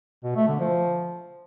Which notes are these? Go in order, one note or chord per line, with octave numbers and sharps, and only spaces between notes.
B2
A3
D3
F3